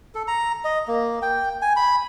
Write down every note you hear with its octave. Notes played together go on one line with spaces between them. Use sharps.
A4
A#5
D#5
A#3
G5
G#5
B5